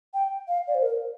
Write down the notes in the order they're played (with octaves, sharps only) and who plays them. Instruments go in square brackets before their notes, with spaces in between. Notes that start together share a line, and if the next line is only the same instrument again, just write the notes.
[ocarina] G5
F5
D5
C5
A#4